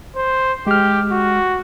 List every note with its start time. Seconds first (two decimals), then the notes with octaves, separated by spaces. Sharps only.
0.16 C5
0.67 G#3 G4 F6
1.11 F#4